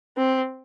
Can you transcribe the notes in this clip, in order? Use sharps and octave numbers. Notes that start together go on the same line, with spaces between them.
C4